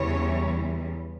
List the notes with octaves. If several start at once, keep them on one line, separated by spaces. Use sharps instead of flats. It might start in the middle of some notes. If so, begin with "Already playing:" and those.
Already playing: E2 C#3 E3 G3 C#5